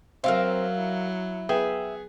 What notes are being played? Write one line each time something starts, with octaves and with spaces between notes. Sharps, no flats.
F#3 C4 A#4 E5 F5
E4
B3 G#4 E5 G5